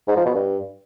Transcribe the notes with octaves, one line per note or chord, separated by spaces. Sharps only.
G#2
F3
B2
G2